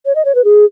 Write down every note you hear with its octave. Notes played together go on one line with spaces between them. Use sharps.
C#5
D#5
C#5
B4
G#4